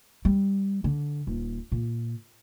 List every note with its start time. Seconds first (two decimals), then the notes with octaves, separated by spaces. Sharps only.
0.25 G3
0.84 D3
1.27 D#1
1.72 A#2